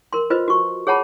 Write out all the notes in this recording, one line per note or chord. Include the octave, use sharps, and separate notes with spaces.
A#4 C6
F4 B4 C5 D#5
F#4 C#6
G#4 C#5 F#5 A5 B5